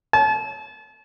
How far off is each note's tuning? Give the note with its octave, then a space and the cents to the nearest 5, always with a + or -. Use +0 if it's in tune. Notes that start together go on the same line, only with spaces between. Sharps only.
A5 -35